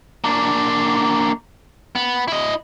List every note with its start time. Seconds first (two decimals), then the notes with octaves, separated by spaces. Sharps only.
0.24 A#3 D4
1.95 B3
2.28 E4 D#5